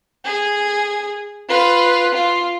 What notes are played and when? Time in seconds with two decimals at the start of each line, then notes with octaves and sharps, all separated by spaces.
0.24 G#4
1.49 F4 B4
2.14 F4